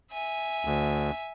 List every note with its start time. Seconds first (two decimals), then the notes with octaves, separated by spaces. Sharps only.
0.12 E5 G#5
0.65 D2